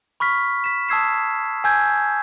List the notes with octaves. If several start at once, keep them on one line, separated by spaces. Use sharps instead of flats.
B5 C#6 F6 B6
B6 E7
A5 D#6 E6 G#6 C7 E7
G#5 E6 G6 G#6